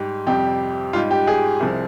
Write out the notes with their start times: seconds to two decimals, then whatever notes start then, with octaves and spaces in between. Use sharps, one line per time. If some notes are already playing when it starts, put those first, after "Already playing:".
Already playing: G#2 G3 G4
0.26 F2 C3 G3 G4
0.93 G#2 G3 F4
1.11 G4
1.27 G#4
1.60 C2 C3 F3